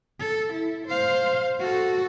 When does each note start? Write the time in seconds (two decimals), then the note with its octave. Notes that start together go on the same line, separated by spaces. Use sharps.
0.20 A4
0.53 E4
0.87 C5 F5
1.60 F#4 A4